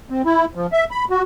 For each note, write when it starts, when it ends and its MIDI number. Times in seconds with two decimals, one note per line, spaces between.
0.10 0.22 60
0.25 0.45 64
0.55 0.67 53
0.73 0.85 76
0.91 1.05 83
1.10 1.22 66